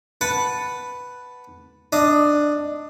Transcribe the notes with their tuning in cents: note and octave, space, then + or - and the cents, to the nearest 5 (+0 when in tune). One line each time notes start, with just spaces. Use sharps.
B4 +0 F#5 +0 A5 +0
D4 +10 D#5 +0